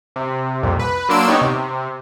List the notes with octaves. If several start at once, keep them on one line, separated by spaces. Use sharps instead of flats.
C3
C2 F2 A#2
B4
F#3 A#3 D4 C6 E6 D7
B3 D#4 G4 C#5 D5
C3